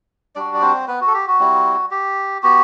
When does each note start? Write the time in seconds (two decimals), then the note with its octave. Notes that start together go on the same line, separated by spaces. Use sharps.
0.36 G3 D4 F#4 D5
0.54 D5
0.62 C4 C5
0.87 B3 B4
1.01 F#4
1.07 A4
1.14 G4
1.27 F#4
1.39 G3 C4 E4
1.91 G4
2.43 B3 F#4 G4